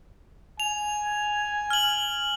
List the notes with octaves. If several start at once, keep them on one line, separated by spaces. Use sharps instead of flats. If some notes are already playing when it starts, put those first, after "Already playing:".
G#5 F7
F6 F#7